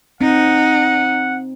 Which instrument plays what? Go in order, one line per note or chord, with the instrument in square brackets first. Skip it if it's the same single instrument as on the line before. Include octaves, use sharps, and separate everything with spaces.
[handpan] C4 [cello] D#4 [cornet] F#5